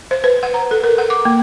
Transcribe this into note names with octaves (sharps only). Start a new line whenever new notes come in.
C5
B4
F#5
A#5
A4
A#4
F#5
D6
A#3